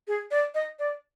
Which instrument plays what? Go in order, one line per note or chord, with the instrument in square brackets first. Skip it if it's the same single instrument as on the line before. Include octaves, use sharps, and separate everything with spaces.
[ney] G#4
D5
D#5
D5